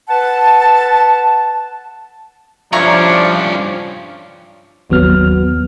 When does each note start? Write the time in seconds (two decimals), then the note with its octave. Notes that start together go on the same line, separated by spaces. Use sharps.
0.08 B4 F#5 A5
2.73 G2 F3 C#4 D4 E4 A#5 C#6
4.90 G1 D#2 F#3 B3 F6